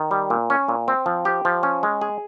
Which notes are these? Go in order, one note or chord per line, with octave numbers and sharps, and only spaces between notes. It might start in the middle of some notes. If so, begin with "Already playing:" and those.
Already playing: D#3
G3
A#2
C#4
A#2
C4
F3
G4
F3
C#4
G#3
G#4